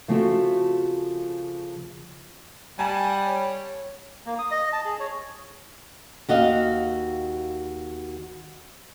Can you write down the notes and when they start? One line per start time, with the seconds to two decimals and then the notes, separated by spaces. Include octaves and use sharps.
0.08 C#3 F3 A3 C4 F4 F#4
2.79 G3 F#5 G#5 A5
3.25 C#5
4.26 A#3
4.39 D#6
4.51 D#5
4.73 A5
4.85 G#4
5.00 C#5
6.29 D#2 F#4 D#5 F5